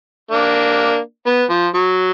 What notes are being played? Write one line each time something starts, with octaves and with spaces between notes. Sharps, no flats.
A#3 D4
B3
F3
F#3